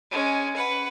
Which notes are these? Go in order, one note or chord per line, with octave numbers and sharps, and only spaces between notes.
G#3 C#4
B4 F#5